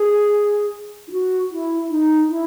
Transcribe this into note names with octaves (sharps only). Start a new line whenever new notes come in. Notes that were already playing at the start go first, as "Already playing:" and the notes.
Already playing: G#4
E4
F#4
E4
D#4
E4